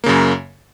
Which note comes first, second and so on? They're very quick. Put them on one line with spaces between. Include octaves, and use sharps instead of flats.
A#3 C#3 F#2